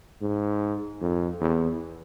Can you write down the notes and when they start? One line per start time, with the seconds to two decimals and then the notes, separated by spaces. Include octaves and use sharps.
0.22 G#2
1.01 F2
1.41 E2